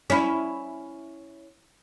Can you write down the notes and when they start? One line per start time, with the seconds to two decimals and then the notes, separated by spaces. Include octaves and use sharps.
0.10 C#4 E4